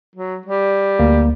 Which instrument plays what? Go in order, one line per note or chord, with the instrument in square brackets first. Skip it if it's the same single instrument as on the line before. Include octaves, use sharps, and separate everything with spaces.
[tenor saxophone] F#3
G3
[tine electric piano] D2 A#3